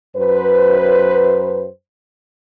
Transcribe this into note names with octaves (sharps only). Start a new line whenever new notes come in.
F#2 B4 C5